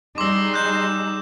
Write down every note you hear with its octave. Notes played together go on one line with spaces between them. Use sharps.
G3 D#4 G#4 C6 D6 E6
F#6 G6 E7